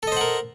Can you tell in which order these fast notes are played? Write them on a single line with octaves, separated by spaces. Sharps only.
A4 D#5 C5 F#5 A#4